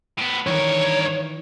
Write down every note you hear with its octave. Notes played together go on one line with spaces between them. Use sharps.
A2 B3
G2 D#3 E3 A#4 C#5